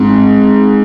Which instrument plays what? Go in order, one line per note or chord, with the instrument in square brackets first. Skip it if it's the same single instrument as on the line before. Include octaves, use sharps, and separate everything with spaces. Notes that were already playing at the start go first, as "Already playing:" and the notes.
Already playing: [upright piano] G#2 [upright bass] C4